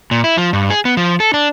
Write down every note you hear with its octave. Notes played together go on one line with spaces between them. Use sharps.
A#2
E4
F3
G2
G#4
B3
F3
A4
D4